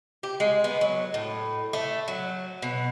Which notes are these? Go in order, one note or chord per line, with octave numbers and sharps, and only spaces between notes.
G4
G#3
B3
F#3
A2
A3
F#3
B2